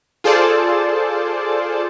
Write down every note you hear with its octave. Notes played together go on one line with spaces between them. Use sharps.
F4 G#4 A4 C5 D5 A5